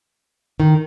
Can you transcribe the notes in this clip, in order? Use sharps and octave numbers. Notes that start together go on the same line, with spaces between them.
D#3